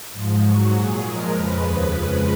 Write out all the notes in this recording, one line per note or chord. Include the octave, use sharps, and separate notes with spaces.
G#2 F3 G#3
G#2 F#3 F#4
A#2 F#3 G#4
A#2 F3 G#3 A#4
F2 C#3 F3 G#3 B4
D#2 C#3 F3
F2 C#3 F3 G#3 B4